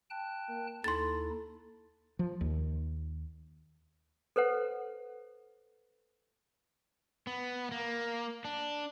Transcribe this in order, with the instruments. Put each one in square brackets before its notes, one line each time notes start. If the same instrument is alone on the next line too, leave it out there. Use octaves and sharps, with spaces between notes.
[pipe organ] G5 A5 F#6
[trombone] A#3
[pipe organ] D#2 D#4 E4 [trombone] A4 [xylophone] C6 A6
[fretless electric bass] F3
D#2
[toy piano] A4 B4 C5 F#5
[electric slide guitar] B3
A#3
D4